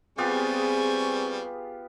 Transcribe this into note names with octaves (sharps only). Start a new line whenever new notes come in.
G3 B3 C4 F4 G4 G#4 G#5 C#6